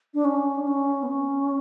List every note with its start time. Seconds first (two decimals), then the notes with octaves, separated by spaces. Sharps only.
0.14 D4
0.25 C#4
0.61 D4
0.67 C#4
1.03 B3
1.09 C#4